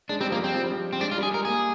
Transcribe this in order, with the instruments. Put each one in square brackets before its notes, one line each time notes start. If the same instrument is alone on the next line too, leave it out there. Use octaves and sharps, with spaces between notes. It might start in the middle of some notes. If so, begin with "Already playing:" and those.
[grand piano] G#3 [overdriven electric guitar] D4
[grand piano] G3 [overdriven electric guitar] C4
[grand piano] F3 [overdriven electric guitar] A#3
[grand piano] G3 [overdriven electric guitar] C4
[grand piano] F3
G3
F3
[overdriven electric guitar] C4
[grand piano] G#3 [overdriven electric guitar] D4
[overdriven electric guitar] F4
[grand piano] G3 [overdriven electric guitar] G#4
[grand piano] G#3 [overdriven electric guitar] A#4
[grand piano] A#3 [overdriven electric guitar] G#4